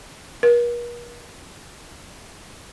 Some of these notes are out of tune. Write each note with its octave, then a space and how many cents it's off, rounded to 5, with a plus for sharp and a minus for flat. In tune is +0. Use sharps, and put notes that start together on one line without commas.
A#4 +45